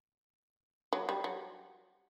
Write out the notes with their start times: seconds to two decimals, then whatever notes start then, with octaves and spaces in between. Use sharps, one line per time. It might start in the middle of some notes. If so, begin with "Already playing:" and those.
0.93 F#3
1.09 G3
1.24 F#3